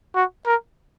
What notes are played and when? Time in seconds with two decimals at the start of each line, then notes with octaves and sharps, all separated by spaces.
0.15 F#4
0.46 A#4